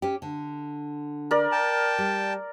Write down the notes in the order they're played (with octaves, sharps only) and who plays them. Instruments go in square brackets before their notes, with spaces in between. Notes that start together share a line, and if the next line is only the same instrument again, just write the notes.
[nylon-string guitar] C#4 G4
D3
[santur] A#4 D5
[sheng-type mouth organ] G5 A5
[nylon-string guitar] G3